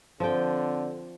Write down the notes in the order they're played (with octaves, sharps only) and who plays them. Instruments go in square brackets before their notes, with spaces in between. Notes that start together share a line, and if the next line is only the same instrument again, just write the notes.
[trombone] D3 [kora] F3 G5 [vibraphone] C4